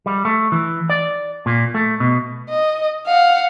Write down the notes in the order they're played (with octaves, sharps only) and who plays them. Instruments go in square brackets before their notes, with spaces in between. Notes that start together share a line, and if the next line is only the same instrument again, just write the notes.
[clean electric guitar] G3
A3
E3
D5
A#2
A3
B2
[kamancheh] D#5
F5 F#5